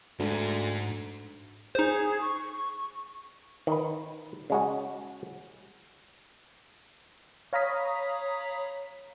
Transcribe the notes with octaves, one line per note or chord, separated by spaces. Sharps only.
D2 G#2
D#4 G#4 C5
C#6
D#3 B4
C#3 G#3 F#4
C#5 F5 A#5 B5 D#6 B6